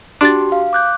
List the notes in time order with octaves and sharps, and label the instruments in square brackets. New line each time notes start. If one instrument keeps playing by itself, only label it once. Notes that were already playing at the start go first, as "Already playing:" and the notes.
[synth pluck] D4 A6 [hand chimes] F#4 G4 C6
[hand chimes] F5
D6 F#6 G6